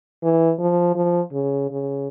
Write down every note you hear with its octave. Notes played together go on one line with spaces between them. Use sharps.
E3
F3
F3
C#3
C#3